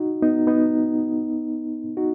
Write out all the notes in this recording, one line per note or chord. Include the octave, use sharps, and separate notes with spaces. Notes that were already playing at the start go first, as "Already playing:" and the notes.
Already playing: D#4 F#4
B3 D#4
B3 D#4
D#4 F#4